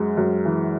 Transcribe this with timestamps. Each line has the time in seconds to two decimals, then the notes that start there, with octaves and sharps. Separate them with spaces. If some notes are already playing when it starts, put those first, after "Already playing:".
Already playing: F#2 G#3
0.17 F#2
0.45 E3